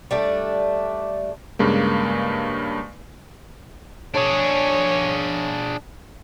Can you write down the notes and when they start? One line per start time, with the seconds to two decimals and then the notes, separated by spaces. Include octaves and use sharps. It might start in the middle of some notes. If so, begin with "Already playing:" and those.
0.11 G3 A3 D4
1.59 G2 C#3 G#3 A#3
4.14 D4 G#4 C#5